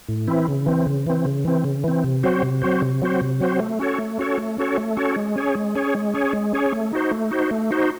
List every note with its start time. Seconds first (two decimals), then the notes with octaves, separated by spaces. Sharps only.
0.09 A2
0.27 E3 C4 E4
0.48 C#3
0.66 E3 C4
0.86 C#3
1.07 E3 C4
1.25 C#3
1.45 E3 C4
1.64 C#3
1.84 E3 C4
2.04 C3
2.23 F#3 C4 F#4 C5
2.43 C3
2.62 F#3 C4 F#4 C5
2.82 C3
3.02 F#3 C4 F#4 C5
3.21 C3
3.40 F#3 C4 F#4 C5
3.59 A3
3.79 C#4 F#4 A4 C#5
3.98 A3
4.19 C#4 F#4 A4 C#5
4.38 A3
4.58 C#4 F#4 A4 C#5
4.78 A3
4.97 C#4 F#4 A4 C#5
5.16 G#3
5.36 C#4 G#4 C#5
5.55 G#3
5.75 C#4 G#4 C#5
5.95 G#3
6.14 C#4 G#4 C#5
6.33 G#3
6.53 C#4 G#4 C#5
6.72 A3
6.93 D#4 F#4 C5
7.11 A3
7.31 D#4 F#4 C5
7.51 A3
7.71 D#4 F#4 C5